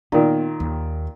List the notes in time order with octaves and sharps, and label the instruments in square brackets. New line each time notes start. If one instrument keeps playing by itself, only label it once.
[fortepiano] A#2 D#3 [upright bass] B3
[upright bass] D#2